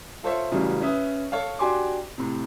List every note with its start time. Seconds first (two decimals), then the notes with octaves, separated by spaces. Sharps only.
0.23 F4 A4 C5 C#5 E5
0.52 A1 A2 C#3 F#3 G3
0.82 C#4 B4 E5 D#6
1.32 A4 C#5 F5
1.59 D4 F#4 G4 G#5 C6 D6
2.18 A2 C3